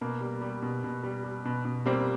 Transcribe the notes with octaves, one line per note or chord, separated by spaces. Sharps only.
B2 A#3
G3
G3
B2
B2
G3
G3
B2
B2
G3 A#3 C4